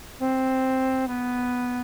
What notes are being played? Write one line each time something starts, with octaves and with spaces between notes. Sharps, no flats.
C4
B3